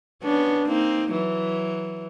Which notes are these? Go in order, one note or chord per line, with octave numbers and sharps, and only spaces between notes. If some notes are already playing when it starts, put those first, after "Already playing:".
B3 C#4 D4
A#3 C4 D#4
E3 F#3